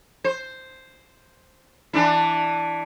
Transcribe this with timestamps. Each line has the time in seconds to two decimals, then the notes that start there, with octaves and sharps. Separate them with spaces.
0.24 C5
1.93 E3 D4 E4